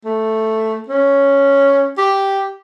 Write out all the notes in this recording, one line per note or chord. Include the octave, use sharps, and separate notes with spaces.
A3
C#4
G4